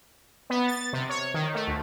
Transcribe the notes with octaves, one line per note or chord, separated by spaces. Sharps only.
B3
A6
C3
C#5
D#3
A3
D2